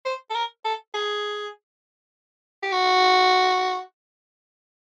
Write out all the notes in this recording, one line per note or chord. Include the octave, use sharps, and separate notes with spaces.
C5
A4
A#4
A4
G#4
G4
F#4